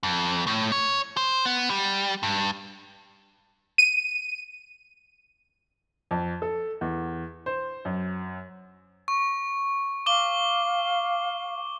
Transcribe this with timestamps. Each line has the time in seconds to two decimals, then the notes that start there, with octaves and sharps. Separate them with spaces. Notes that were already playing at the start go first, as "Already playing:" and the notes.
0.03 F2
0.47 A2
0.72 C#5
1.17 C5
1.45 B3
1.70 G3
2.23 G2
3.78 D#7
6.11 F2
6.42 A4
6.81 E2
7.46 C5
7.85 F#2
9.08 C#6
10.06 F5 D6 G7